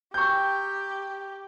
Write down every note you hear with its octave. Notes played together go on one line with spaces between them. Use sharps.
G4 G5 A#5 C#6 E6 G6